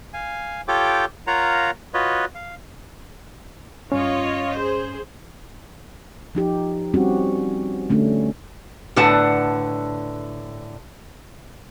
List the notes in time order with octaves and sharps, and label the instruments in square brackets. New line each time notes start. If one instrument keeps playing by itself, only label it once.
[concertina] F5 G#5
F4 G4 A4 C#5 G5 D6
F4 A#4 C#5 F5 F#5 A#5
F4 F#4 B4 C#5 D#5
F5
[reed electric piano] G2 C#4 [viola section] F4 C#5 D#5
[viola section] G#4 C5
[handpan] F3 D#4 G4
G3 C4 C#4 F#4 G4
D3 A3 C#4 D4
[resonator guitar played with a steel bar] A2 D3 D4 B4 F#5 A5